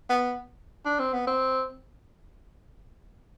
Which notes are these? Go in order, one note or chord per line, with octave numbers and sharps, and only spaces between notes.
B3
D4
C4
B3
C4